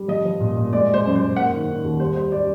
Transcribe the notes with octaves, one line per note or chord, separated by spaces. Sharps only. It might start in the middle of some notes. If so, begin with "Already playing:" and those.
Already playing: G3
F3 D#5
F3
A#2
A#2
G#3 D5
G#3
C5
F#2
F#2 C5
A#3 F#5
D#3
D#3
D#2
G3 C5
G3 C5
G3 D5